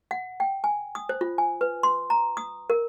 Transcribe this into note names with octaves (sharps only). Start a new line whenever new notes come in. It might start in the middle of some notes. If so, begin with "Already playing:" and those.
F#5
G5
G#5
D#6
C5
F4
G#5
B4
C6
A#5
D#6
A#4